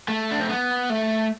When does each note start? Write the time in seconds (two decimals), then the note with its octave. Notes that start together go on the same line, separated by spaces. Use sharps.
0.08 A3
0.31 D4
0.40 C4
0.49 B3
0.90 A3